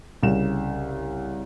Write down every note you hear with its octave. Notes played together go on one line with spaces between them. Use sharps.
C2 C#3 E7